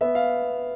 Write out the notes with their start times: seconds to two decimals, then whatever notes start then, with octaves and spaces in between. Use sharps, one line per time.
0.01 B3 E5
0.15 F5